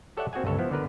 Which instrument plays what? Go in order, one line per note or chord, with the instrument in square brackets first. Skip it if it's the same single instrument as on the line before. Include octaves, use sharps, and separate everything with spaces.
[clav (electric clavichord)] G4 A4 C#5 D5 E5 F#5
A#3 C4 F#4 G#4 F#5 G#5
G1 C#2 A4 C#5
F3 B3 E4
D3 B3 A#4 B4